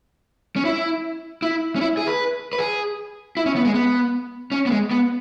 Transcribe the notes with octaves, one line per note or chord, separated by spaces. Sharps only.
C#4
E4
E4
C#4
E4
G#4
B4
B4
G#4
E4
C#4
B3
G#3
B3
C#4
B3
G#3
B3